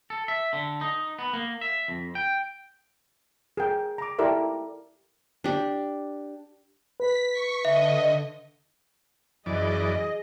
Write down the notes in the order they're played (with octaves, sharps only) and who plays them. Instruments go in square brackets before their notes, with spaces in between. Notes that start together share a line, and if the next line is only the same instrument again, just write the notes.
[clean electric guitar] A4
E5
D3
D#4
B3
A#3
E5
F2
G5
[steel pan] G#4 A#4 G5
A#5 D6
E4 G4 A4 A#4 D5 E5
[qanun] D4 G4
[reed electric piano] B4 [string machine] B6
[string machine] C#6
[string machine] D3 D#5 [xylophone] E5
[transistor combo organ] F#2 E3 D5 [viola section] G#4 D#5